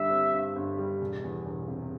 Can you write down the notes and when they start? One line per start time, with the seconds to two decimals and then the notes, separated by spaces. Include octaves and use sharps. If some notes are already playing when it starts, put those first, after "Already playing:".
Already playing: G1 G2 G3 E5
0.10 C4
0.33 G2
0.56 G1
0.78 G3
1.01 E1
1.24 E2
1.46 E1
1.68 C3